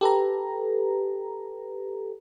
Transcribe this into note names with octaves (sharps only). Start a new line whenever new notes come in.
G4 A4 B4 A#5